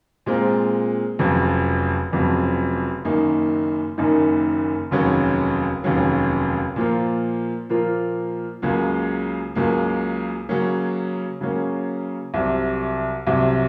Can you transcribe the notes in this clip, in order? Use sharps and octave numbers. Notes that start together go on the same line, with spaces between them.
A#2 G#3 C4 F4 A#4
F1 F2 C#3 F#3
F1 F2 C#3 F#3
F#1 F#2 D#3 A#3 D#4
F#1 F#2 D#3 A#3 D#4
F1 D#2 C#3 F#3 C#4
F1 D#2 C#3 F#3 C#4
A#2 F3 A#3 F4 A#4
A#2 F3 A#3 F4 A#4
C#2 C#3 F#3 A#3
C#2 C#3 F#3 A#3
C#3 F#3 A#3 C#4
C#3 F#3 A#3 C#4
C2 C3 F#3
C2 C3 F#3